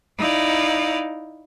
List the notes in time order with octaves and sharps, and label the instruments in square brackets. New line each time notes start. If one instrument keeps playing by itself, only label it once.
[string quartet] D#4 E4 D5 F5